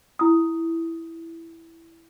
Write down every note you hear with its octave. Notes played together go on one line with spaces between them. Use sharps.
E4 D#6